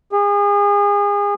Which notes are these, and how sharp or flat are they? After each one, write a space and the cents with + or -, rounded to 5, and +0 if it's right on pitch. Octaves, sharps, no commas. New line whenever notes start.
G#4 -35